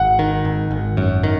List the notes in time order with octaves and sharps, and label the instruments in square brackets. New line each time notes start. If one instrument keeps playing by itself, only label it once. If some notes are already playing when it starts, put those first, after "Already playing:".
Already playing: [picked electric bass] G#1 [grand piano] F#5
[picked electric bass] D#3
G#1
G#1
F#2
D#3